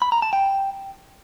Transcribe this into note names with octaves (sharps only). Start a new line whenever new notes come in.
B5
A#5
A5
G5